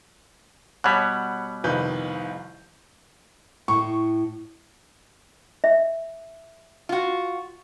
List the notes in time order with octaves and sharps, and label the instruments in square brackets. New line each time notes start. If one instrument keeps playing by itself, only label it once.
[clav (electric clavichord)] B2 G3 [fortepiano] C#5 F#5 B5 [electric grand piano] F#6 G#6 B6
[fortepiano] C2 F2 [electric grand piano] D#3 B4 G6
[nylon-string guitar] A2 [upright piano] C#6
[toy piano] E5
[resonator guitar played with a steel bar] F4 F#4